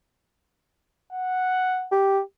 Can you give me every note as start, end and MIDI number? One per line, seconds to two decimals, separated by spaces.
1.13 1.87 78
1.92 2.20 67